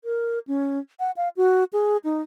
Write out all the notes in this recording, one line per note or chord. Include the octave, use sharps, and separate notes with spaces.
A#4
C#4
F#5
F5
F#4
G#4
D#4